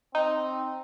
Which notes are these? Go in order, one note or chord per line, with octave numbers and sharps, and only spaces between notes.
C4 D#4